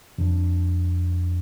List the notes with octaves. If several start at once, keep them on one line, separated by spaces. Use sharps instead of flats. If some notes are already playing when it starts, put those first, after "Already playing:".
F2 D4